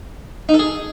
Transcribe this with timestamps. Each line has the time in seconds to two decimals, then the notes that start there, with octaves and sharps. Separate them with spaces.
0.49 D#4
0.54 A4
0.59 G#4